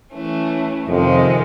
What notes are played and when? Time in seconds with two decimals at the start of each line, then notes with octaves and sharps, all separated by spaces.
0.13 E3 A3 C#4
0.88 F2 C3 D#3 G#3